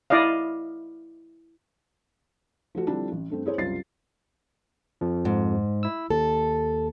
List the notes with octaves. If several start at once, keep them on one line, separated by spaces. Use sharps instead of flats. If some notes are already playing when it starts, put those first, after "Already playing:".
E4 D5 D#5 F5
F3 A3 F#4
D3 F3 G3 C4 D4 E4
A1
G2 A3 C4
E4 G#4 C5 C#5
F#1 C2 F4 A6 C7
F2 F3
G#2
E4 E6
D#2 A4